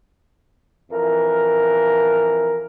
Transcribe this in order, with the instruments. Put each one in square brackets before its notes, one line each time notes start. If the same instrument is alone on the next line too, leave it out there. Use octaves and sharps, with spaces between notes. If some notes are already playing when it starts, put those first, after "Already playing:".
[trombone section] F2 E3 A#4